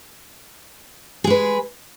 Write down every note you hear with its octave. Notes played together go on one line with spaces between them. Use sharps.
G#3 G#4 B4